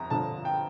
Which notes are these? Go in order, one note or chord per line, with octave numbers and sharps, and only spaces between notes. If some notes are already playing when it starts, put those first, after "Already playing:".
Already playing: G1 F2 A#5
G1 F2 D3 F3 A5
G5